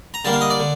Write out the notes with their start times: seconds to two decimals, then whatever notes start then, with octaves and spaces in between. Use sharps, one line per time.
0.14 A#5
0.25 D3 G3 A#3 A5
0.33 F5
0.41 D#5
0.50 D5
0.60 D3